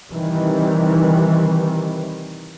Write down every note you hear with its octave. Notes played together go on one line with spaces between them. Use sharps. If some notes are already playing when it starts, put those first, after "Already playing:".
C3 D#3 E3 G3